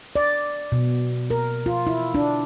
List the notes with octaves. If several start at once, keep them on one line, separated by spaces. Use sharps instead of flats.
D5
B2
A#4
F4
E4
D4